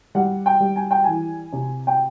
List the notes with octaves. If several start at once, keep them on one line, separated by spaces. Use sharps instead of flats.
G3 F#5
G5
G3
G#5
G5
E3 G#5
C3
G5